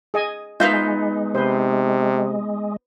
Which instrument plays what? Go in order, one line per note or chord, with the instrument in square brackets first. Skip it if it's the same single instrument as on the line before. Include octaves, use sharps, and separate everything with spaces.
[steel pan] G#4 D#5 G#5
[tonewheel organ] G#3 [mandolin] B3 D#4 G6 [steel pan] F4 E5 F5
[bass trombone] C3 [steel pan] B4 C5